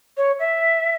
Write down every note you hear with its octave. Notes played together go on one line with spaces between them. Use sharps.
C#5
E5